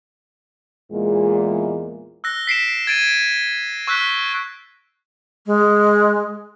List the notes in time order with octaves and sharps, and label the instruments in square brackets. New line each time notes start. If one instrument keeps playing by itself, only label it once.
[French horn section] E2 A#2 G#3
[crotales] E6 F#6 A#6
B6 C7 D7 E7
G#6 A6 D7 D#7
C#6 E6 F#6 G6 B6
[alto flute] G#3